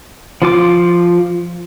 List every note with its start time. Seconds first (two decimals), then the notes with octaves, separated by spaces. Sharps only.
0.42 F3 F4 D6